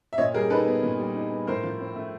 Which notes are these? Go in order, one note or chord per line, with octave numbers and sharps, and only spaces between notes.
E5
A#2 C#5 D#5
G3 G#4 A#4
D#4 A4 B4
B3
A#2
G3
D#4
B3
A2 A#4 C5
F3
C4
A3